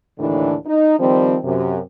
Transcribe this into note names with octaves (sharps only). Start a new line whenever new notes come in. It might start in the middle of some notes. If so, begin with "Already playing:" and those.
D#2 A2 D3 E3 D4
D#4
D#3 F3 G3 C4
F#2 C3